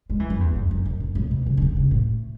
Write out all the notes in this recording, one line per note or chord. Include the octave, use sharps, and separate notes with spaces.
G#3
E3
F#2
E2
F#2
F#2
F#2
F#2
A2
B2
C#3
C#3
D3
C#3
A2